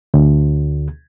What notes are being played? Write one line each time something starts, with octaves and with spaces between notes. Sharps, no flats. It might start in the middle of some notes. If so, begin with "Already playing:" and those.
D2